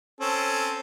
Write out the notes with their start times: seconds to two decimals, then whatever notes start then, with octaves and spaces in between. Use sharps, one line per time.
0.21 C4 C#4 A4